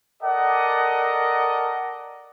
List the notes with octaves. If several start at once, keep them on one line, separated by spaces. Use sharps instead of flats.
A4 A#4 D5 D#5 F#5